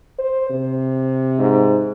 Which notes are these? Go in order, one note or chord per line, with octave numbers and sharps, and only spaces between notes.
C5
C3
G#2